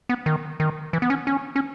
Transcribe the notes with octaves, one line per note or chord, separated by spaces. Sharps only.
B3
D#3
D#3
E3
B3
C#4
C#4
C#4